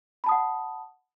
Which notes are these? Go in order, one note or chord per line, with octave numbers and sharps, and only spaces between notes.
F#5 A5 B5 D#6